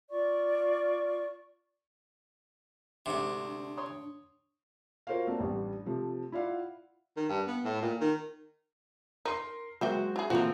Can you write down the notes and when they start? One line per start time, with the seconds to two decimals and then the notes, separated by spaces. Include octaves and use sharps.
0.10 F4 D5 C#6
3.06 D2 G#2 C3 D4
3.77 C#5 C6 D#6
5.07 F4 F#4 A#4 C5 C#5 F5
5.27 A3 A#3 C4 D4
5.40 A1 G3 D4
5.86 C3 F3 A3
6.32 E4 F4 D5 F5 F#5
7.17 D#3
7.29 G2
7.47 B3
7.64 A2
7.82 A#2
8.01 D#3
9.25 D#4 A#4 C6
9.81 F#3 G#3 A#3 F#4 C5 E5 G5
10.16 E4 G#4
10.30 A#2 E3 F3 G#3 A3 C4 F#4 A#4